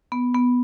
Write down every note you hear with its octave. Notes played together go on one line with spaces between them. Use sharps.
B3
B3